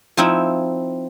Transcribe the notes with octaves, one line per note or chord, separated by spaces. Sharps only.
F3 C4 D#4 E4